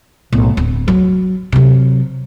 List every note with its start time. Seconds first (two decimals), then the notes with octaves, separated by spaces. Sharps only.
0.33 B1 A2
0.57 D1
0.88 F#3
1.52 C3 F#3